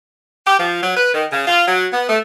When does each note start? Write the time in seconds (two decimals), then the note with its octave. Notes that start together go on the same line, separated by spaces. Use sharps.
0.47 G4
0.60 F3
0.83 F#3
0.97 B4
1.14 D#3
1.32 C#3
1.47 F4
1.68 F#3
1.93 B3
2.09 A3